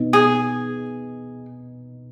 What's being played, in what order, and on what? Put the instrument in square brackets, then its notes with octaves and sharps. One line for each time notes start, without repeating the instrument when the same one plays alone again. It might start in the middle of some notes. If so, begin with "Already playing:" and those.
Already playing: [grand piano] B2 B3 D#4
[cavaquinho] G#4